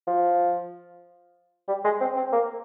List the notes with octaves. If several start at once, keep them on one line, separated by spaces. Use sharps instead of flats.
F3
G3
G#3
C4
C4
A#3